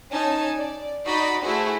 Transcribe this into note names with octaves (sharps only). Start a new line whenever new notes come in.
C#4 D#4 G#5 A5
D5
D#4 F#4 D5 D#5 B5
A3 E4 F#4 G#4 C5